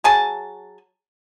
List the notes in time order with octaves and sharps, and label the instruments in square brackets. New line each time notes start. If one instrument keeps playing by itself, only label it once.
[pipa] F#3 G#4 G#5 A5